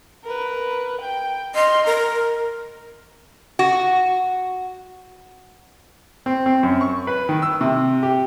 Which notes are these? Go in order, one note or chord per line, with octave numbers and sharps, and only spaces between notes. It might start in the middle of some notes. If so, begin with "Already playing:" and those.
A#4 B4
G5
D#5 C6 F6
A#4 A#5
F#4
C4
C4
F#2
C#6
B4
D#3
E6
C3
G4